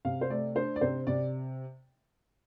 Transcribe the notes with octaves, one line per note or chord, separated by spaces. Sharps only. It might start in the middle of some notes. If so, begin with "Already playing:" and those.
C3 F5
C5
A3 D5
D4 C5
D5
C3 C5
C3 D5